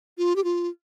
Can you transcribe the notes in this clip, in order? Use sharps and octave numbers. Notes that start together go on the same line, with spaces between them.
F4
G4
F4